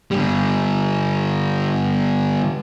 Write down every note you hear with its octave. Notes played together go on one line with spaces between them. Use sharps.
D3 G3